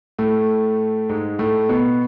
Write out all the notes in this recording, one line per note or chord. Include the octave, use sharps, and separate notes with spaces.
A2 A3
G#2 G#3
A2 A3
B2 B3